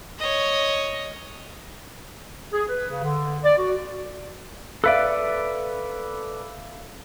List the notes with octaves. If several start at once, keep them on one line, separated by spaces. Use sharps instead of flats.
C#5 D#5
G#4
B4
C#3
D3
D5
F#4
A4 B4 D5 E5 F5 F#6